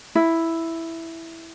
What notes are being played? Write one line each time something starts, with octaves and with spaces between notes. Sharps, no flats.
E4